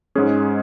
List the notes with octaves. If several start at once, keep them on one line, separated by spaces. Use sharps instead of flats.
G#2 G#3 C#4 G#4